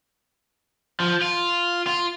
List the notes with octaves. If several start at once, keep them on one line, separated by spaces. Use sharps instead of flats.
F3
F4
F4